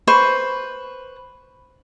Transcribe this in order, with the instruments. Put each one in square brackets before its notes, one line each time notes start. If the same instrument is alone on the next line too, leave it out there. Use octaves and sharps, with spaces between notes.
[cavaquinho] B4 C5 C#6